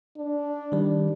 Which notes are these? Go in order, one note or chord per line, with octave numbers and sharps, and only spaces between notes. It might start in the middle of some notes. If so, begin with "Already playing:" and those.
D4
D#3 G3